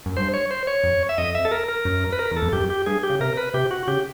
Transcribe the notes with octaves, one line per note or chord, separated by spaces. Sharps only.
F#2
G2 C5
C#5
C5
C#5
F2
E5
F2 D#5
E5
A4
A#4
A#4
F#2
B4
A#4
E2
A4
F2
F#2 G4
G4
G2 G#4
G4
C#3
C3 A#4
B4
C3 G4
F#4
C#3 G4